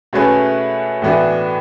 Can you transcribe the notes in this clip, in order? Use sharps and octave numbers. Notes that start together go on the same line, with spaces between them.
B2 A3 C#4 G#4 B4
A2 E3 B3 D4 F#4